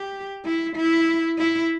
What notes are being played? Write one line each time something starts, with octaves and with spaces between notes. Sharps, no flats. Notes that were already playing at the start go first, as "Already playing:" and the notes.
Already playing: G4
E4
E4
E4